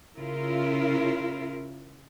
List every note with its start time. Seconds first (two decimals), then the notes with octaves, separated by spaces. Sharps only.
0.16 C#3 E4 F4 A#4